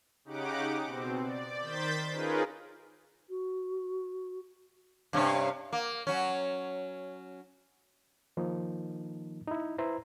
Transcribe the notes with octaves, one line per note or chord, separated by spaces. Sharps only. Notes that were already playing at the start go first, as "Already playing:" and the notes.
C#3 D#4 G4 F#5 D6
B2 C4
D5
D#3 C5 G6 A6 B6
C#4 D#4 F4 G#4 A#4 B4
F#4
G2 C3 C#4
A#3
F#3 C#4
D#3 F3 A#3 D#4
D#4 E4
E4 B4 C5 A#5